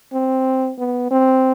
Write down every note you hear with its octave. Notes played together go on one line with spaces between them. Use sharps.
C4
B3
C4